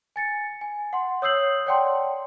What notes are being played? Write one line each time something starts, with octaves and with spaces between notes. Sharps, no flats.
G#5 A6 C#7
G#5
F#5 C6
C#5 D#6 E6 G6 C7 F#7
C#5 D5 F#5 G5 A5 C6